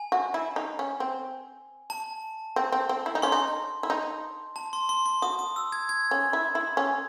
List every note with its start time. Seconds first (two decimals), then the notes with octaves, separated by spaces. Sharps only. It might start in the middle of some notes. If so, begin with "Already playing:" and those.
Already playing: G#5
0.12 F#4
0.34 E4
0.56 D#4
0.79 C#4
1.00 C4
1.90 A5
2.56 C4
2.72 C4
2.89 C4
3.06 E4
3.15 D#4
3.22 C#4 C6
3.32 D#4
3.83 E4
3.90 D#4
4.56 A5
4.73 C6
4.89 C6
5.06 C6
5.22 F#4 D#6
5.39 D#6
5.56 E6
5.72 G#6
5.89 G#6
6.11 C#4
6.33 E4
6.55 E4
6.77 C#4